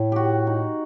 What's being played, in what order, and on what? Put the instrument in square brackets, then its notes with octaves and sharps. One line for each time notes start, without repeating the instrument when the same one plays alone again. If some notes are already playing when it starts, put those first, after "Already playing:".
Already playing: [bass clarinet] A2
[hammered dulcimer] F#4 G4
D#4